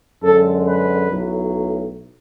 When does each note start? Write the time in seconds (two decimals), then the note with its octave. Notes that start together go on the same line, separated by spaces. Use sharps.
0.23 F#2 D3 G#3 A4
0.66 B4
1.08 B1 A2 F#3